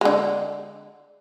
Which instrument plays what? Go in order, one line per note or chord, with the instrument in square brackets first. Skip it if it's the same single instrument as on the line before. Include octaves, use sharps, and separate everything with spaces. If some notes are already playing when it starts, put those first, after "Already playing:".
[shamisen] D3 G#3